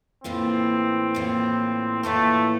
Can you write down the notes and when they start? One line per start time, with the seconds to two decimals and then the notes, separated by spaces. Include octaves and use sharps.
0.24 A2 E3 A#3 C4 F4
1.14 A2 E3 A#3 F4
2.03 A2 E3 A3 A#3 F4